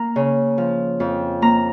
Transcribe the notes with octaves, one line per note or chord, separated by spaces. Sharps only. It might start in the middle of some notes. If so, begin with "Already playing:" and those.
Already playing: A#3 A#5
C#3
F3
F2
A#3 A#5